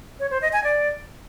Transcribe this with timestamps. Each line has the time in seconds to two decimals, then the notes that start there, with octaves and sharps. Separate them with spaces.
0.20 C#5
0.31 C5
0.42 D#5
0.53 G#5
0.64 D5